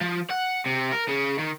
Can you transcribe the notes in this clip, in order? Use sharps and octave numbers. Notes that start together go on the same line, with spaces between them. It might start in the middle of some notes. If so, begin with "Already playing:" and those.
F3
F#5
C3
A#4
C#3
D#3